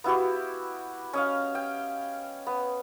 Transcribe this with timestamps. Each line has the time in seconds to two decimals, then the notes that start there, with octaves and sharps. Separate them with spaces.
0.04 B3 E4 F#4 G4
1.13 C#4 D#5 F5
1.55 G5
2.47 B3